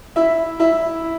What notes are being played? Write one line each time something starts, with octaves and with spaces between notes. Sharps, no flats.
E4 E5
E4 E5